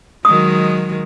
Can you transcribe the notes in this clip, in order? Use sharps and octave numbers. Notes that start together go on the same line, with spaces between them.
D#3 F#3 G#3 D#6